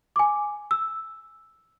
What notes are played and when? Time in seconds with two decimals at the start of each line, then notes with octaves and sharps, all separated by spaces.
0.16 G#5 D6
0.71 E6